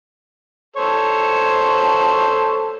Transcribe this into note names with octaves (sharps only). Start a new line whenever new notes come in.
A4 C5 C#5